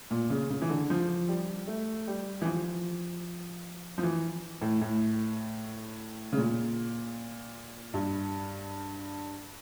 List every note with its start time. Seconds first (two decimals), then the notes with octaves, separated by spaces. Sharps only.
0.11 A#2
0.30 C#3
0.50 C#3
0.62 E3
0.70 D3
0.90 F3
1.29 G3
1.67 A3
2.07 G3
2.42 E3
2.45 F3
3.98 F3
4.03 E3
4.61 A2
4.81 A2
6.33 C#3
6.37 A#2
7.94 G2